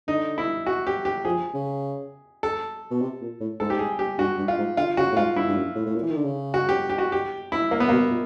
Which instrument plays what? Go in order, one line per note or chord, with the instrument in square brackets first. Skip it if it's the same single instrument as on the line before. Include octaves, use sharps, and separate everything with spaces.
[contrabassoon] D3 [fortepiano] D#4
[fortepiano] E4
F#4
G4
G4
[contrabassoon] F3 [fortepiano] G#4
[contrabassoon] C#3
[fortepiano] A4
[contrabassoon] B2
C3
A#2
A2
[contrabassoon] G#2 [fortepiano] A4
[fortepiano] G4
G#4
G4
[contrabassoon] G2 [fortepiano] F#4
[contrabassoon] G2
[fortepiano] F4
[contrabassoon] G#2
[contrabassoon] D3 [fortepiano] F4
[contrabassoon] C#3 [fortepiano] F#4
[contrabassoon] A2
[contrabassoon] G#2 [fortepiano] F4
[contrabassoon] G2 [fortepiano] E4
[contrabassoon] G2
F#2
A2
A2
A#2
E3
D#3
D3
C#3
[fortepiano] F#4
G4
G4
F#4
G4
E4
A#3
B3
[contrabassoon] B2 [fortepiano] A#3
[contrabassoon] A#2